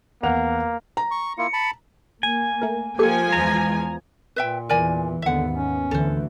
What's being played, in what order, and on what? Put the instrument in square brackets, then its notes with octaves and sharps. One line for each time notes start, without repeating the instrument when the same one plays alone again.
[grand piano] E2 F#5 F7 [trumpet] A#3
[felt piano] A#5
[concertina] C#6
[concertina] A#3 E4 F4 [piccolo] C#7
[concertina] A5 B5
[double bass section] A#3 [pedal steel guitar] G#5
[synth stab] A3 A#4
[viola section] F3 G#5 [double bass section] A#3 [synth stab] G4 A4 C#7
[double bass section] E2 E3 G#3 [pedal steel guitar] A#5
[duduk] A#2 [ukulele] B4 E5 G5
[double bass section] E2 E3 [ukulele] A#4 D5 G#5
[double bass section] D#2 G#2 B3 [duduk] D3 [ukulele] E5 F#5
[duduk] C#4
[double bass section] D2 E3 [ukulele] A4 C5